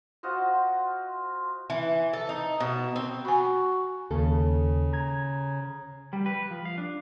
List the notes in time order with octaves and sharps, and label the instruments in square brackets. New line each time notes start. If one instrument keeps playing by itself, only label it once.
[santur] F4 F#4 C5 D#5
[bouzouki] E3
A4
D#4
B2
C4
[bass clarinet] F#4 [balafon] G#5 B5
[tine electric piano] D#2 [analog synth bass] C#3 [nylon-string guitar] A4
[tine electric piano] A#5 G#6
[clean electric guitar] G3
B4
F3
F5
D4